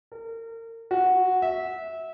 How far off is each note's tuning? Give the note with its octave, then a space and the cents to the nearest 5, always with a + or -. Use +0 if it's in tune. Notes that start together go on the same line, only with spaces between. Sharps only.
A#4 -35
F#4 -5
E5 -20